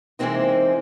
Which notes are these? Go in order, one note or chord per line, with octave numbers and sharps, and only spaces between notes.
C3 E3 G#3 A#3 C4 D#4